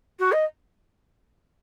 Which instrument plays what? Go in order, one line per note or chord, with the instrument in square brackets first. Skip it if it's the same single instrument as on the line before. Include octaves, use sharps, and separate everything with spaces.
[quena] F#4
D#5